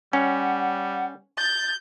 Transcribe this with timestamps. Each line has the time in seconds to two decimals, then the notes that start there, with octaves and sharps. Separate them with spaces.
0.13 G3 C#4 F#5
1.38 G6 A6